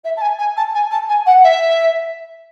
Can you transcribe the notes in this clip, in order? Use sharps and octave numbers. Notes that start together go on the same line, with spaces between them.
E5
A5
G#5
G#5
A5
G#5
A5
G#5
F#5
E5